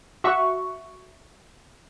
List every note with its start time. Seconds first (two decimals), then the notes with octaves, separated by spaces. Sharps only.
0.24 F#4 E5 C#6